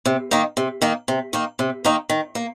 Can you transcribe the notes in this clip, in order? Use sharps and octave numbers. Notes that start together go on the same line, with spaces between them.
C3
D#3 A#3 D#4
C3
D#3 A#3 D#4
C3
D#3 A#3 D#4
C3
D#3 A#3 D#4
D#3
A#3